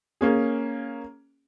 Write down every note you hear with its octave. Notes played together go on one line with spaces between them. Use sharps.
A#3 C#4 G#4